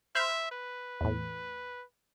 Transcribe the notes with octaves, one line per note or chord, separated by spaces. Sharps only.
C5 E5 B5 F6
B4
E2 A2